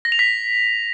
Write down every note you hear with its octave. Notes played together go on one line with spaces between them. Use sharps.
A#6
F7
B6